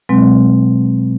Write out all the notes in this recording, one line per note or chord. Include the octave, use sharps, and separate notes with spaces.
B2 F#3 G#3 C4